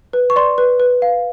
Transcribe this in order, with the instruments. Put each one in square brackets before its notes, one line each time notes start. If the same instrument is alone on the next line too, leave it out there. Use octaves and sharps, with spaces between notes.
[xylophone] B4
C#6
D5 C6
B4
B4
F5